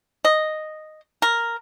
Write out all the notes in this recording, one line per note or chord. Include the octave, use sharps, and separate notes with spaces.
D#5
A#4